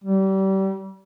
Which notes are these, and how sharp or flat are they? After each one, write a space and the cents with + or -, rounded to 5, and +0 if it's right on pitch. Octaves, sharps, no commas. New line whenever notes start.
G3 -30